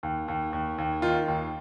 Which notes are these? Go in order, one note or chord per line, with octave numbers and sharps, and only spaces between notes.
D#2
D#2
D#2
D#2
D#3 F4
D#2